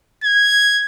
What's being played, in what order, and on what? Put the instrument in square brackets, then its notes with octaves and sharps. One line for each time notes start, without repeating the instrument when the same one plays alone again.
[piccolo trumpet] G#6